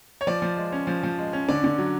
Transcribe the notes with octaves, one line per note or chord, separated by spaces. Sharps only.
C#5
F3 D5
F3
G#3
C#4
F3
F3
G#3
C#4
D3 D5
D3
F#3